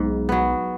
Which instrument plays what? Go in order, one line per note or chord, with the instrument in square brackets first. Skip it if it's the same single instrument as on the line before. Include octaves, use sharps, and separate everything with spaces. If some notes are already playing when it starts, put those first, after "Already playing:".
Already playing: [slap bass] B1 B2 [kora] G#2
[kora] F#3 B3